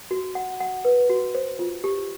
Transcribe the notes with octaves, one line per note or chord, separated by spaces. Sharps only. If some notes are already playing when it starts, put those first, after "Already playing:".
F#4
F#5
F#5
B4
F#4
C5
F4
G4